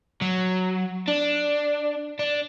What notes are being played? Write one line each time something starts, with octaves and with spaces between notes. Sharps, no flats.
F#3
D4
D4